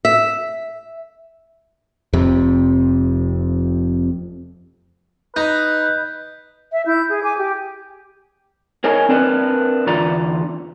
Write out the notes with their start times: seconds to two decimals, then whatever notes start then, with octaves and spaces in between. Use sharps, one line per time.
0.05 E5
2.13 F1 F2 C3
5.36 D#4 B4 D#5 G6
6.73 E5
6.87 E4 G6
7.10 G#4
7.24 G#5 D6
7.38 G4
8.84 G#4 A#4 C#5 D#5 G#5 A#5
9.09 C4 D4 A#4 B4
9.87 E2 D3 F4 D5 A#5